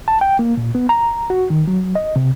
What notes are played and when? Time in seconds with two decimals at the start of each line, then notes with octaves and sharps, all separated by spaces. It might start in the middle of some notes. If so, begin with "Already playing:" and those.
0.08 A5
0.21 G5
0.39 A#3
0.57 A#2
0.75 B3
0.89 A#5
1.30 F#4
1.50 D#3
1.68 F#3
1.95 D#5
2.16 C3